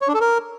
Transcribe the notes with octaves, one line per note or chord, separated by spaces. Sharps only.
C#5
D4
A4
A#4